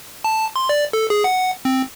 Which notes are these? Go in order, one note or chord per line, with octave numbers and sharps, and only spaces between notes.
A5
C6
D5
A4
G#4
F#5
C4